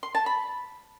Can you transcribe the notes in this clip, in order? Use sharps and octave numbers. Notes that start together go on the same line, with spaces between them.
C6
A5
B5